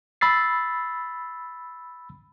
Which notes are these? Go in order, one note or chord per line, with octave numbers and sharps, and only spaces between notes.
B5 E6 A6 C7